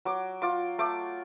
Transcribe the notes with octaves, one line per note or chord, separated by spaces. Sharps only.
F#3 D6
F4 D6
A3 D6